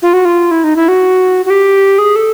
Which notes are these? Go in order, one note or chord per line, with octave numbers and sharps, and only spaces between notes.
F4
F#4
F4
E4
D#4
E4
F#4
F#4
G4
G#4
A4